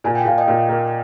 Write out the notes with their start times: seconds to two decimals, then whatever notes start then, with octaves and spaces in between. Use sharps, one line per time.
0.04 A#2 G#5
0.15 G5
0.25 A#2 F5
0.38 D#5 G5
0.48 A#2
0.69 A#3